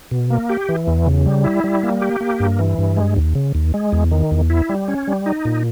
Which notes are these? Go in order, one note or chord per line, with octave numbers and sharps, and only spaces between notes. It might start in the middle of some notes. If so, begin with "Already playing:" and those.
B2
A#3
G4
E3
E2
C#3
G3
E4
G3
A#3
G4
A#3
G2
E3
G2
G#3
D#2
C#3
D#2
G#3
E2
D#3
E2
E4
G3
C#4
G3
D#4
A#2